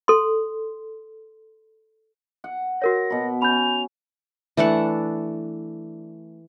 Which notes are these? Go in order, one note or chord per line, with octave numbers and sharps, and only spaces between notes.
A4 C6
F#5
F#4 A#4 C#5 A#6
B2 B5
C#4 B5 G6 F7
E3 A3 D4 F#5